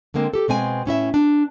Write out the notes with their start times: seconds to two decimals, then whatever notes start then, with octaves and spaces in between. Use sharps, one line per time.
0.14 D3 G#3 A#3 C4
0.33 G4 A4
0.48 B2 G#3 C4 G#5
0.86 A2 C#4 E4 E5
1.14 D4